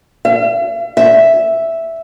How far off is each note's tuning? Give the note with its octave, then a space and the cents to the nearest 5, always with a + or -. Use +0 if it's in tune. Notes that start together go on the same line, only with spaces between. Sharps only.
E5 +45
E5 +0